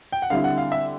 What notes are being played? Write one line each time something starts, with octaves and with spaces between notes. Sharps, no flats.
G5
F#5
D3 G3 C4 E4 F5
F#5
F5
E5